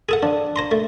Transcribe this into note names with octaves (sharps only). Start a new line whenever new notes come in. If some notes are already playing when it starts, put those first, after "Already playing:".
G#4 A4 F#5
F3 D4
C5 A#5 C6
A3